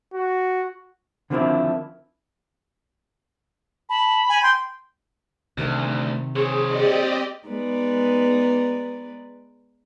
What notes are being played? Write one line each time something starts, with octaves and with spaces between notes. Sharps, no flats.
F#4
D3 D#3 F3 C4 D4 E4
A5 B5
G#5
G5 C6
D2 C3 D#3 D#4
C4 G#4 C#5
G4 D5 D#5
G#3 B3 D#4 B4 D5